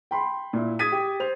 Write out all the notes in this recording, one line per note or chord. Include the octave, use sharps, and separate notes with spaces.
G5 B5 C6
A#2 E4
D#6 G#6 A6 B6 D#7
G4
C5 F7